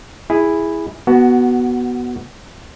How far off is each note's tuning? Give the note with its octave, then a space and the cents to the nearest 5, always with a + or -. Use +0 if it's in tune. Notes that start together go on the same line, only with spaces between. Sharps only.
E4 +0 G#4 -10
B3 -10 F#4 +15 A5 +0